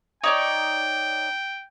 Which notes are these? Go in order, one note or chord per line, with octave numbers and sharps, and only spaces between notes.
D#4 C#5 D5 G5